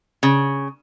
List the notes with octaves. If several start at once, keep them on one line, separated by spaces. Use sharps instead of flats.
C#3